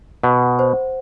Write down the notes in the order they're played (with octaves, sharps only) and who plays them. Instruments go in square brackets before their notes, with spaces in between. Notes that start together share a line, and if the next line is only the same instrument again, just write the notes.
[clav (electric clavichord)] B2 [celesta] F#5
[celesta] C5